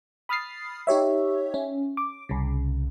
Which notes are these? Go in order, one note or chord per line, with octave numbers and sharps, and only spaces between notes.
B5 D#6 F6 A6 C7
D#4 G4 C#5 E5
C#4
D6
C2 C#3